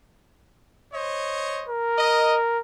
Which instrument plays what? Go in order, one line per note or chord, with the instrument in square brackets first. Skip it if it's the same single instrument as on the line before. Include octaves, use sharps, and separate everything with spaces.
[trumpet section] C5 C#5 D#5
[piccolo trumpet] A#4
[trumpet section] D#5